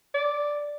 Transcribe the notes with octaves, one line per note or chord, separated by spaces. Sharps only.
D5